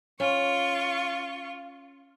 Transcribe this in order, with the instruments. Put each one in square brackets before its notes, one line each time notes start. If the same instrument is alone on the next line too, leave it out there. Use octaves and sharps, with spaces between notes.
[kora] C#4 [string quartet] F4 C#6